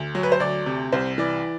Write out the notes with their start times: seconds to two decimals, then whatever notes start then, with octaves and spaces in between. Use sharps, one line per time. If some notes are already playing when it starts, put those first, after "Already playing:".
Already playing: D2
0.15 F#3
0.23 B4
0.32 C5
0.40 D2 D5
0.66 C3
0.92 C2 C5
1.18 E3 D5